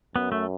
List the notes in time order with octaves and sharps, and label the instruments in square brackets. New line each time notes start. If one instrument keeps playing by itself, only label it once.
[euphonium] F#2 [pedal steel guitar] B3
[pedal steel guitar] A3